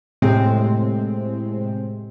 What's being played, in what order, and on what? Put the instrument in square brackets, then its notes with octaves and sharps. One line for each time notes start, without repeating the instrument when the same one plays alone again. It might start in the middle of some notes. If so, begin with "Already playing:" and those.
[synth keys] A2 C3 G#3 C4